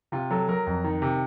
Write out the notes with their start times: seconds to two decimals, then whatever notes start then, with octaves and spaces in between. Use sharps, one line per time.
0.12 C3 F4
0.31 F#3 A4
0.49 F#3 A#4
0.66 F2
0.84 D#3
1.02 C3